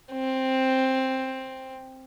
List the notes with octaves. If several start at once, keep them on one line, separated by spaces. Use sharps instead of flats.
C4